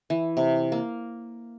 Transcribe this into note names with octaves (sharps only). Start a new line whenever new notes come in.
E3
C3
A#3